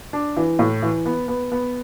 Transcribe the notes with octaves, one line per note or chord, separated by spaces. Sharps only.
D4
E3
A2
E3
B3
B3
B3